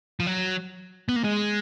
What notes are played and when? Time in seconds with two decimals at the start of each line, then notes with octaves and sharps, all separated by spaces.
0.20 F3
0.27 F#3
1.09 B3
1.16 A#3
1.24 G#3